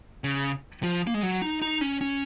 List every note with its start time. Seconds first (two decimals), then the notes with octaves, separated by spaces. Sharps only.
0.24 C#3
0.83 F3
1.07 A#3
1.14 G#3
1.23 F#3
1.42 D#4
1.62 D#4
1.81 C#4
2.01 C#4